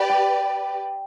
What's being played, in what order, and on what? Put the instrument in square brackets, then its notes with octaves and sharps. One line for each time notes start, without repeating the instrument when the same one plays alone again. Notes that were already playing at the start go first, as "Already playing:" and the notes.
Already playing: [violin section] G4 B4 D5
[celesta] G5